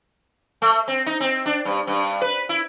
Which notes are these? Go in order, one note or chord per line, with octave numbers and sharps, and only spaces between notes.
A3
C4
D#4
C4
D4
G2
G2
B4
E4